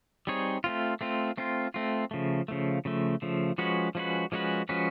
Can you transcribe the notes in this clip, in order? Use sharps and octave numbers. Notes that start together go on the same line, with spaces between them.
G3 C4 D#4 G#4 C#5
A3 C4 F4
A3 C4 F4
A3 C4 F4
A3 C4 F4
C#3 F3 A3
C#3 F3 A3
C#3 F3 A3
C#3 F3 A3
F3 G#3 C#4 F#4 B4
F3 G#3 C#4 F#4 B4
F3 G#3 C#4 F#4 B4
F3 G#3 C#4 F#4 B4